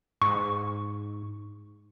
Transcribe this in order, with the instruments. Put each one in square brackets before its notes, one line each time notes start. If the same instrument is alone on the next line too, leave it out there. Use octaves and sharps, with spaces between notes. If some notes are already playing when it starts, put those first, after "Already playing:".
[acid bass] G#2 [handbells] C#6